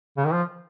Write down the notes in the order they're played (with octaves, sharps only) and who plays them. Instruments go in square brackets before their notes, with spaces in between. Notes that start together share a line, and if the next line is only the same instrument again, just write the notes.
[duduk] C#3
D#3
F3